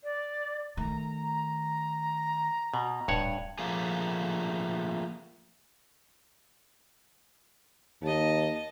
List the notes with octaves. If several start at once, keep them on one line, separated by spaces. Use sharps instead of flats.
D5
D#3 A3 A#5
B2
D1 G2 C#5 F#5
F3 A3 A#3 G#4
D#2 D#5 A5